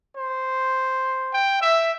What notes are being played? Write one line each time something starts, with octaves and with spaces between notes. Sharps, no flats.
C5
G5
E5